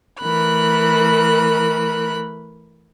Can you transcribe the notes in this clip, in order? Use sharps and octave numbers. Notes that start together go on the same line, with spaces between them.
E3 A3 A#4 B5 F#6